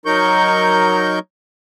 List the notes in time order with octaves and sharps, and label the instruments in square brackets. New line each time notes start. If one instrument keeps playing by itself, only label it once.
[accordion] F#3 D#4 A#4 C#6 G6